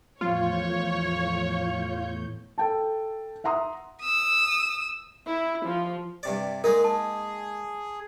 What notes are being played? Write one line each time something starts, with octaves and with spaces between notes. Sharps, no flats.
E2 A2 F3 F4 C#5 G6
A4 G5 A5
E5 F#5 A#5 C6 D#6
D#6 E6
E4
F3
G2 C3 D5
G#3 A#3 D#4 G#4 A#4
A5